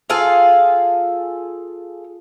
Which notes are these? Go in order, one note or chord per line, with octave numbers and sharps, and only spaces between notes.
F4 G#4 A4 F5